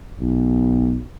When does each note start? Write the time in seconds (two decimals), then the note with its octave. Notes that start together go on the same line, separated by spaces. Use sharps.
0.20 B1